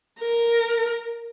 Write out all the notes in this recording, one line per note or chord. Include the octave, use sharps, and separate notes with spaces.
A#4